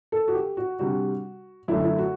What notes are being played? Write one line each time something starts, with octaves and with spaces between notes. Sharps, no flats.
A4
F#4
G4
F#4
C3 G3 D4 F#4
F#2 D3 A3 E4
E4
F#4